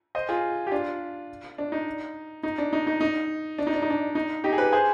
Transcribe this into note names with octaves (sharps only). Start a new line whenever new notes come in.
C5 D#5
F4 G#4
G4
D4 F4
D4
D#4
D#4
D4
D#4
D#4
D#4
D4
D#4
D4
D#4
D4
D#4
D#4 G4
G#4
G4 B4
G#4 C5